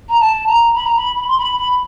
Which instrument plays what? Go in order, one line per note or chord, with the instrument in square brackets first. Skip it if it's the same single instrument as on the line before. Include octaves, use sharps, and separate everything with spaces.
[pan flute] A#5
A5
A#5
B5
A#5
B5
B5
C6
B5
B5